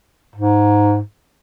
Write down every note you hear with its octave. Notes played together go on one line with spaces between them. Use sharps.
G#2